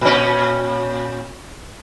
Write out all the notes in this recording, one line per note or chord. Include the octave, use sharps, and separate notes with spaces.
A#2 C#4